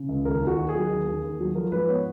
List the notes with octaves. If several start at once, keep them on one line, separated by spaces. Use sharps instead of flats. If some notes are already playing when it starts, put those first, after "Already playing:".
Already playing: C#3
C#2
D#2 A#4
D#2
F#4
D#3
G#4
F#3
D#2
D#2
D#2
F#3
F3 A#4
G#2 B4
B3 C#5